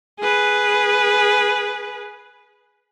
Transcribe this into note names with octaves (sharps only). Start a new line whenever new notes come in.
G#4 B4